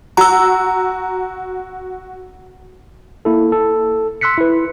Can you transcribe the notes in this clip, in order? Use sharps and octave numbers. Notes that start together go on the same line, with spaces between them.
F#4 A#5 E6
A#3 E4 A4
A4
C6 E6 F#6 B6 C#7
E4 B4